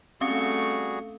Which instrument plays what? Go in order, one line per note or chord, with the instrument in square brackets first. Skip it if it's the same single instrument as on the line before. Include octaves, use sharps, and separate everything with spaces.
[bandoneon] G3 F#4 G#4 [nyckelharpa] A3 C#6 [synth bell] C4 C#4 F5